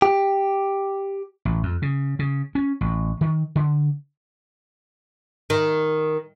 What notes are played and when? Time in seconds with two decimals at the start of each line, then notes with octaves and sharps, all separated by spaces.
0.02 G4
1.45 A1
1.63 F2
1.82 C#3
2.19 C#3
2.55 C#4
2.81 A1
3.21 D#3
3.56 D3
5.50 D#3